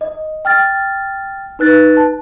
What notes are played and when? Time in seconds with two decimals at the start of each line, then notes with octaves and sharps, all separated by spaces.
0.01 D#5
0.45 G5 F6 A6
1.59 D#4 B4 F#6 A6
1.97 A5